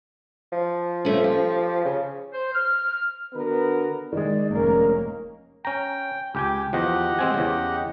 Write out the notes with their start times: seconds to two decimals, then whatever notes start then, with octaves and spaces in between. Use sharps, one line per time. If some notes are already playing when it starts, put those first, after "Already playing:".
0.53 F3
1.05 A3 C#4
1.24 G4
1.85 C#3
2.34 C5
2.53 F6
3.34 D3 B3 F#4 A#4 B4
4.13 D#3 G#3 D5
4.54 F1 A#3 C#4 A#4
5.65 C#4 G5 A#5
6.35 C#2 G4 G5 G#5
6.73 E2 F3 G4 D#5 F#5
7.19 G#3 C4 G#5
7.34 E2 C#3